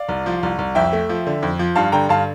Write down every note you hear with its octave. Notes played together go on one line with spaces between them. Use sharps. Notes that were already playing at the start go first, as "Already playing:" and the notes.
Already playing: D5 F5
C2
F3
C2
C2
F2 E5 G5
A3
F3
D3
F2
F3
G2 F5 A5
D3 G5 A#5
G2 F5 A5